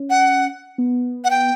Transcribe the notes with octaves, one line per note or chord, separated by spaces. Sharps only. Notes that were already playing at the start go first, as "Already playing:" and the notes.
Already playing: C#4
F#5
B3
F#5
G5